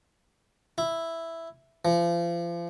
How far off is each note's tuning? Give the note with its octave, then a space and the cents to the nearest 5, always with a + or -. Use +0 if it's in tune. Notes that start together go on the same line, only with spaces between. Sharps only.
E4 +0
F3 -35